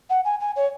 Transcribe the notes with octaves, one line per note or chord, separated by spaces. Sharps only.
F#5
G#5
G#5
C#5